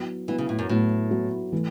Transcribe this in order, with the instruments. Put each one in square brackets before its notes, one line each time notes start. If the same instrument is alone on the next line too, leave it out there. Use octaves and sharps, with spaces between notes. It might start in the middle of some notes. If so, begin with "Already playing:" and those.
Already playing: [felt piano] F#3 B3 E4
[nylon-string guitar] E3 [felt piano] F#3 B3 E4
[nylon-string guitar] C#3
A2
F#2
[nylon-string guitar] A2 [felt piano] F#3 B3 E4
[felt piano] F#3 B3 E4
E3 A3